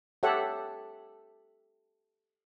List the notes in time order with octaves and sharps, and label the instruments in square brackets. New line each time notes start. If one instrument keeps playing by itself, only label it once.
[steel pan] G4 A4 C#5 E5 F#5